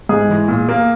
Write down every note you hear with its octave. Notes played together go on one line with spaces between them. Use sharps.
G#2 G#4
E3 G#3
A#2
A#3